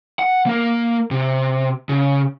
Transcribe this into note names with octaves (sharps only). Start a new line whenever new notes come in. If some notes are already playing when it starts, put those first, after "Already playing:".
F#5
A#3 A#4
C3
C#3